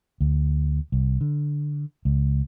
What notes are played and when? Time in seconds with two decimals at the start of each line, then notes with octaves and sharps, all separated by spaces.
0.20 D2
0.92 C2
1.21 D3
2.05 C#2